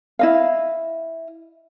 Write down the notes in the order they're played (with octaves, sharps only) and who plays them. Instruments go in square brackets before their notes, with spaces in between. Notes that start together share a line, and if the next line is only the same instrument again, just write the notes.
[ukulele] E4 D#5 F5